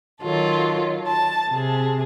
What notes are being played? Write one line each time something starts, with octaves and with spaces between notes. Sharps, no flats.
D#3 F#3 F4 A4
A5
C3 G#4